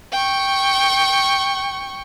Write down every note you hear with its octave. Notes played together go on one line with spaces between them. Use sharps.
G5 C#6